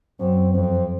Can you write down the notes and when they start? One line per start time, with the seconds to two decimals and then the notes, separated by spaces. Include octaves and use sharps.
0.20 F#2 C4
0.54 F2 C4